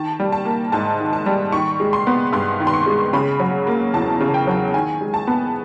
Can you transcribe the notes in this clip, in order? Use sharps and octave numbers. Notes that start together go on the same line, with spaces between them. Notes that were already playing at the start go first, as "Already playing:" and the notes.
Already playing: D#3 A5
G3
A5
A#3
G#2 A5
D#3
A5
G3
D#3 C#6
G#3
C6
B3
G2 C6
D#3
C6
C#6
G#3
C#3 B5
F#3
A#3
E2 A5
C#3
G5
F#3
D#3 G#5
G#3
A5
B3